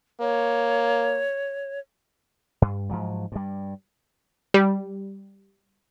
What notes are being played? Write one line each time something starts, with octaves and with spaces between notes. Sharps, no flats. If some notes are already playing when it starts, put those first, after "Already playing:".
A#3 C#5
G2
G#2 F3 F#3
G2 G3
G3